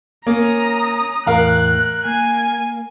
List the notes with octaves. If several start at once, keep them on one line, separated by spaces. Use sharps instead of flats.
A#3 C#4 A#5 D#6
E2 A2 A#4 F5 A#5 F#6
A#3 G#5